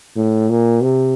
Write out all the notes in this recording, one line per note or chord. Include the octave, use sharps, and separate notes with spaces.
A2
A#2
C3